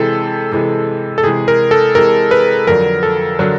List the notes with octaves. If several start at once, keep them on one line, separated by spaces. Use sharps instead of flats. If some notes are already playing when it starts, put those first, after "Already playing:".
Already playing: C3 E3 G#3 A4
C3 E3 G#3
A4
C3 E3 G#3 G#4
A#4
A4
C3 E3 G#3 A#4
B4
F2 D3 F#3 A#4
A4
D3 F#3